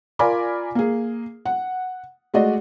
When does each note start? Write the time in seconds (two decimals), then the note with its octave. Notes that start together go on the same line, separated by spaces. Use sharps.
0.19 F4 A#4 D5 G#5 B5 D6
0.75 A#3 G#4
1.46 F#5
2.34 G#3 A3 F#4 D5 D#5